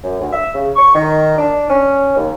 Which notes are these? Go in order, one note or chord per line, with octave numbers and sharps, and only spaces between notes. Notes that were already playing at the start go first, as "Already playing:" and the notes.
F#2
D2
E5
C#3
C#6
D#3
D4
C#4
D#2